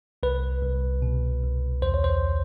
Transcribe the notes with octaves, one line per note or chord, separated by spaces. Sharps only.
C2 B4
C2
B2
C2
E2 C5
C#5
C5